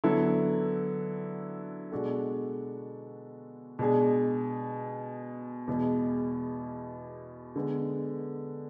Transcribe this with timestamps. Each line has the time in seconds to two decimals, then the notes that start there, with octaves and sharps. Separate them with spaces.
0.04 D3 F#3 B3 E4 A4
1.92 B2 G#3 D4 F#4 A4
3.79 B2 G#3 D4 G#4
5.67 E2 B2 G#3
7.56 D3 G#3 B3